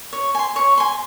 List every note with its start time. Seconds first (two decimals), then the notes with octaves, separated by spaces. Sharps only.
0.13 C#5
0.35 G#5 C6
0.56 C#5
0.78 G#5 C6